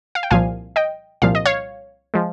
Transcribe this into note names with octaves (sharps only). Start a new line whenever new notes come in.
F5
G5
C2 A#2 F3 F5 G#5
D#5 G5
C2 A#2 F3 F5
D#5
C#5 F5
F3 G#3